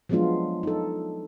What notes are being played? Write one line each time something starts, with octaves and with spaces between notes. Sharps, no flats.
F3 F#3 G#3 B3 D4 F4
D#4 A4